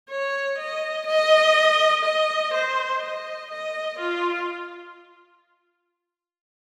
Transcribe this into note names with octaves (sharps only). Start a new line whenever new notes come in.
C#5
D#5
D#5
D#5
C5
D#5
D#5
F4